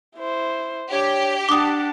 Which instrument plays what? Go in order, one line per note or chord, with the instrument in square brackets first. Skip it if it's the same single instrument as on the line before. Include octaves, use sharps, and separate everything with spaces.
[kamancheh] E4 C5
[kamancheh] D4 [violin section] G4 [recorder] C#5
[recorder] D4 [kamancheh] F#5 A5 [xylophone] D6 D#6